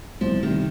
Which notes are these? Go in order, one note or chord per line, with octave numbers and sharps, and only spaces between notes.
C2 F3
C3 D#3 G3